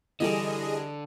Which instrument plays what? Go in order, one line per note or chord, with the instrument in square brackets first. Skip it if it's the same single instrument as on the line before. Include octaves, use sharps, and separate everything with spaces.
[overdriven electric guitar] D3 [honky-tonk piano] E3 G3 A4 [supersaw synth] G#4 D#5